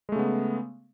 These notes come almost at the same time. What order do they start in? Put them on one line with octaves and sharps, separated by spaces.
G#3 A3 C#3 B3